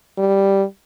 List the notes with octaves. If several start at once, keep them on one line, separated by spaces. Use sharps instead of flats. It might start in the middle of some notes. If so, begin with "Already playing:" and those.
G3